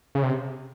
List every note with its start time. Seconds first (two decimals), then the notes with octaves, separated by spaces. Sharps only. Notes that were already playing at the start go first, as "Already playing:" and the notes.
0.15 C#3
0.23 C3